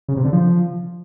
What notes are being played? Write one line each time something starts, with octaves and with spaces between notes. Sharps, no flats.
C#3
C3
D3
F3